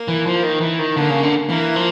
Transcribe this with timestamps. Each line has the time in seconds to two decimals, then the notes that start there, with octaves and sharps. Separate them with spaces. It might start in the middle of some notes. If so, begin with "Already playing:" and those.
Already playing: A#3
0.08 E3
0.26 F3
0.43 D#3
0.61 E3
0.79 D#3
0.96 D3 A#3
1.10 C#3
1.23 D3
1.49 E3 A#3
1.76 F3